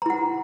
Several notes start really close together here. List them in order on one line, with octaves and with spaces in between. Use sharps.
A#5 E4 F#5